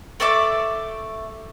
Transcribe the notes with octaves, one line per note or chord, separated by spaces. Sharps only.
A3 D5 E5 D6